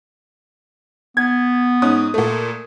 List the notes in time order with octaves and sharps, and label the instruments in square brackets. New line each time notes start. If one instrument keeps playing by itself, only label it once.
[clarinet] B3 [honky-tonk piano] G#6
[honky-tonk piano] G#2 C#4 D#6
A#2 A3